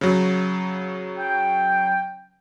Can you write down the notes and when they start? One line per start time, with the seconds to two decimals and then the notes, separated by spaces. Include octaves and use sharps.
0.01 C#3 F#3
1.18 G5